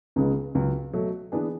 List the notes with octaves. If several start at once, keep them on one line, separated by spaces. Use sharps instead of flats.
C#2 C#3 G#3 B3
C#2 C#3 F#3
B2 F#3 A3
E3 B3 D4 G#4